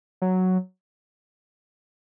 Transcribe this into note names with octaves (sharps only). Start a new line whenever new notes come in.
F#3